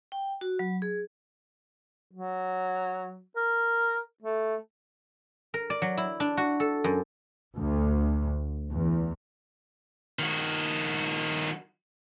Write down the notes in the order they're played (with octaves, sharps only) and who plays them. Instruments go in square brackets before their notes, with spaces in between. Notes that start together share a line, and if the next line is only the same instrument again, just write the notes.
[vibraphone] G5
F#4
F#3
G#4
[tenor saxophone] F#3
A#4
A3
[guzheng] A#4
D5
F#3
E4
D4
F#4
A4
F#2
[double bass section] D2
E2
[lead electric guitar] D#3 F#4